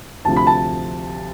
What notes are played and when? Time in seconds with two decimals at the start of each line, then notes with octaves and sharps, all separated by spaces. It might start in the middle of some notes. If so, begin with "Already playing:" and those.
0.25 D2 C3 F3 A5
0.36 B5
0.47 A5